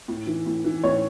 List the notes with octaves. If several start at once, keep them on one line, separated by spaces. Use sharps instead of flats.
A2
E3
A2
E3
A2 C#5